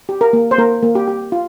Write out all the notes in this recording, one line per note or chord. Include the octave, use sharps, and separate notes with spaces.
G4
A#4
A#3
C5
A#3 A#4
A#3
G4
G4
F4